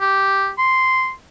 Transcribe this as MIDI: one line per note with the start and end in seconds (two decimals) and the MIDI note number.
0.01 0.50 67
0.58 1.12 84